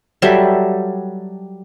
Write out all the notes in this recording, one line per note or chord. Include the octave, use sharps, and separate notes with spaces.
F#3 G3 A4 E5